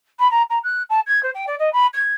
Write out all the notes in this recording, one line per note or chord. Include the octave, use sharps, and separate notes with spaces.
B5
A#5
A#5
F#6
A5
G#6
C5
G5
D5
D#5
B5
G#6